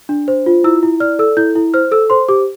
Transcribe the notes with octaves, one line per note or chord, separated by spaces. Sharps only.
D4
C5
F4
E4 E6
E4
D5 F6
A4 E6
E4 G6
E4
C5 F6
A4 E6
C5 C6
G4 D6